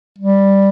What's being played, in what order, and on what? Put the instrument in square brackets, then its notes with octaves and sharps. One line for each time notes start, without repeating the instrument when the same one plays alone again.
[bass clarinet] G3